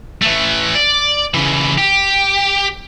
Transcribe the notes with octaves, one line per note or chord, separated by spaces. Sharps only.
E3 A3
D5
C#3 E3
G4